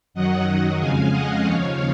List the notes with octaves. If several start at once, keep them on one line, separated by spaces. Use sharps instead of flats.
F#2 D#3 F#3 D#5 F#5
F2 C#3 G#3 F5 G#5
D#5 F#5
D#2 C#3 F3 C#5 F5